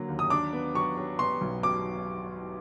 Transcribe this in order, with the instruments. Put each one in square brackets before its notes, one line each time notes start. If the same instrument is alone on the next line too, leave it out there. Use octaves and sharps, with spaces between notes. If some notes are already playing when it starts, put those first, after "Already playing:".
Already playing: [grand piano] D3 F#3 A#3
D#2
[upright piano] D#6
[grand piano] D4 [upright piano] D6
[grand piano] B3
[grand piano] F#3 [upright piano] C#6
[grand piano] F#3
[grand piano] B3 [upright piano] C6
[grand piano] B1
[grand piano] B2 [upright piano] D6